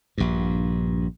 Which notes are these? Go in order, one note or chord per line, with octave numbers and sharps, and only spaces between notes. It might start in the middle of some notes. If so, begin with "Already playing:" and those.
A#1 G2